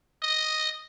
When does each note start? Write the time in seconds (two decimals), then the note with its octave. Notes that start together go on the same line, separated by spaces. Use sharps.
0.23 D#5